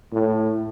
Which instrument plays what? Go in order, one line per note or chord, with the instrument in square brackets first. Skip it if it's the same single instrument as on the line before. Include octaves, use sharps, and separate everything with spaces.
[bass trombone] A2